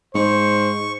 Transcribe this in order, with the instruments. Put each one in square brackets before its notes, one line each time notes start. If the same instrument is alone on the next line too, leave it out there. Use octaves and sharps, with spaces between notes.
[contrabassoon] G#2 [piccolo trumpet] C5 [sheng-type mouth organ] C#6